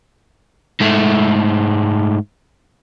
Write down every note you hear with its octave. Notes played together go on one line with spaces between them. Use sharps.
G#2 A3